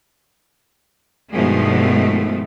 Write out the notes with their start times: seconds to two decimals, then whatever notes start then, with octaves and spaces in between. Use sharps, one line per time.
1.32 G2 B2 D#3 F3 G#3 A3